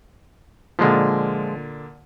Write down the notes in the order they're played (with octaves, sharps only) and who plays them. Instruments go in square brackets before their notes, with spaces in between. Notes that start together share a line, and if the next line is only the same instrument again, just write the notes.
[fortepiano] A#2 D3 [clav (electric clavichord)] F3 G#3